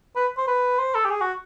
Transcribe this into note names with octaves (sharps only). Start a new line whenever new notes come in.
B4
C5
B4
C5
A4
G4
G#4
F#4